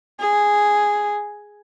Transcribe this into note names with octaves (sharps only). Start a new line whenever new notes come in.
G#4